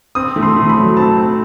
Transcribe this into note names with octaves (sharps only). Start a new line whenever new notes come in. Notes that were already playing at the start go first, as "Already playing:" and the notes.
C4 D#6
A3
C6
A3
B5
F#3
C4 A5
C4